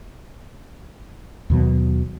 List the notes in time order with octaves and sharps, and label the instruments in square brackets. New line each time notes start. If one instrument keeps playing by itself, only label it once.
[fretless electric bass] D#2 B2 F#3